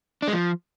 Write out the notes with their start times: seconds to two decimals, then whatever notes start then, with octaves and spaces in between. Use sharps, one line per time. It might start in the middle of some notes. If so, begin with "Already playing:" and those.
0.22 D4
0.28 G#3
0.33 F3